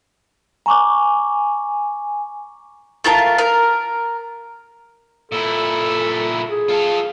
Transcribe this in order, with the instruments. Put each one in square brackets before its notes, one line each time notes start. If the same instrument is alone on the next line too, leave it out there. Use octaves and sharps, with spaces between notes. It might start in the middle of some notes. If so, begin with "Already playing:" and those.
[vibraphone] G#5 [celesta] A#5 C#6 D6
[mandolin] A3 F4 A#4 A5
A#4
[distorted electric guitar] A#2 E4 [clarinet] A4
[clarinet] G#4
[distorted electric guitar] F4 A4